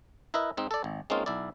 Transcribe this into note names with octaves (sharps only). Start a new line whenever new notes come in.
E4 A#4 B4 D#5 E5
G#2 C4 D#4
A4 D5
G#1
G#3 A#3 C4 C#4 D#4 F4
B1 E4 D5